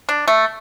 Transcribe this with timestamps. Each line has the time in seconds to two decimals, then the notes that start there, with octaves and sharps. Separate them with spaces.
0.09 D4
0.28 A3